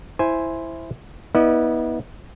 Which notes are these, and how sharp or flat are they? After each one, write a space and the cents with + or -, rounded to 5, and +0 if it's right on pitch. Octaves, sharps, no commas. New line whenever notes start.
E4 +0 C5 +0 G#5 +0
B3 -20 E4 -45 D5 +45